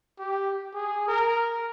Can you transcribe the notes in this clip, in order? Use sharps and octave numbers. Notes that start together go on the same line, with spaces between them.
G4
G#4
A#4